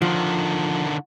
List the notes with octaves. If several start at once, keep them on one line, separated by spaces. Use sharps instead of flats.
D3 D#3 F3